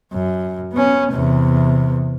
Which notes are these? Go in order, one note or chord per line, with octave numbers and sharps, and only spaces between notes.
F#2
B3 C#4
E2 C3